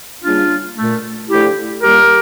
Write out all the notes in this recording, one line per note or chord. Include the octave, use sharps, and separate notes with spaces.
C#3 G3 A#3 D4 F4
A#2 A3
D3 F3 A3 E4 G4
A#2 G3 A#3 G4 A#4